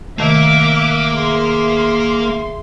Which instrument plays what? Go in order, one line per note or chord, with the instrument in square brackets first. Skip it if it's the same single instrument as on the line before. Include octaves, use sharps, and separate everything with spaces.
[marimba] C3 D#3 A3 [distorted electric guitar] A#3 [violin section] E5 D6 F#6
[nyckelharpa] G#4 E5 [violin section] C6